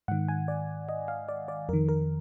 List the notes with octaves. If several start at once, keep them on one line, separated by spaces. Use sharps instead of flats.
G#2 D#3 F#5
G#5
D5
D#5
F5
D5
D5
F2 D#3 A#4
A#4